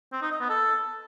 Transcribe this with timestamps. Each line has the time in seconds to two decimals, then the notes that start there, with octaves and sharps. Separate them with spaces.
0.12 C4
0.22 D#4
0.31 D#5
0.40 B3
0.50 A4